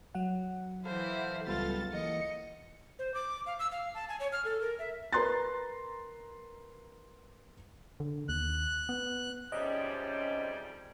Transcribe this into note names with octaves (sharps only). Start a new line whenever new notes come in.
F#3 F#5
E3 E4 A4 C5 F5
C#2 G3 B3 F4 A4 A6
E3 A#3 D#5 C#7
C5
D6
F5
E6
F5
A5
G#5
C#5
F6
A4
A#4
E5
A#4 B4 A#5 C6 F#6 A6
D3
D#2 F#6
B3
F2 G#2 C3 G3 C#4 G4 D#5